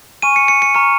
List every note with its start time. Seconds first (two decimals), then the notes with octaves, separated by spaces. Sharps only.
0.22 G#5 C#6 F6 D#7
0.36 C#7
0.48 C#7
0.62 C#7
0.75 A#5 C#6 F6 C#7